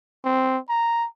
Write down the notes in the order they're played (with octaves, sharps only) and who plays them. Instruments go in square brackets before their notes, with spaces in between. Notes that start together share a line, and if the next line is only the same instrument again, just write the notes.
[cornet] C4
A#5